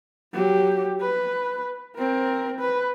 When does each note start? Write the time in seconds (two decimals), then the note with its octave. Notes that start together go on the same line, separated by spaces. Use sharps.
0.33 F#3 G4
1.01 B4
1.97 C4 A#4
2.60 B4